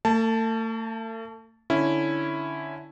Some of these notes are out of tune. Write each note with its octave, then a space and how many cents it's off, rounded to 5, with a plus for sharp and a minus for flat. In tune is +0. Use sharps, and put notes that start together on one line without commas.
A3 +40 A5 +0
D3 +0 C#4 +0 E4 +0